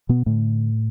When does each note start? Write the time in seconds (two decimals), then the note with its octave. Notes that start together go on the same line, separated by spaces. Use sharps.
0.09 B2 B3
0.26 A2 D3 A3